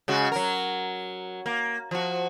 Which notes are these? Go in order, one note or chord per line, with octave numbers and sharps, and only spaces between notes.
C#3 G#3 F#4
F#3 A#4
A#3
F3 F#4